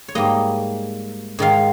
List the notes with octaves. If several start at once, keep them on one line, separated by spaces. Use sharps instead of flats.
C#5
G#2 G3 A#3 D#5
G#2 D#3 G#3 F5